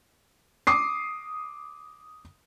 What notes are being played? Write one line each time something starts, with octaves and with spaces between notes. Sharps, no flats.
D6 D#6 C7